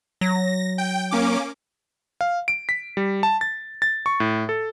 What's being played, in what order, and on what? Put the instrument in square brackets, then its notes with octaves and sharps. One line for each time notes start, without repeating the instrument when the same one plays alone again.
[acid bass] F#3 [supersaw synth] A#6
[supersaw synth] G5
A#3 C#4 D6
[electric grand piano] F5
D7
B6
G3
A5
A6
A6
C#6
A2
A4